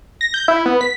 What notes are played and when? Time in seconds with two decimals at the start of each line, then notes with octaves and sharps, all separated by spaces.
0.21 A#6
0.34 G6
0.48 E4
0.66 B3
0.81 B6